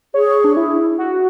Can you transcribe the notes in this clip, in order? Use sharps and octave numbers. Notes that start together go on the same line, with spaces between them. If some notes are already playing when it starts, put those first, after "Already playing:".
G#4 C#5
D4
E4
F#4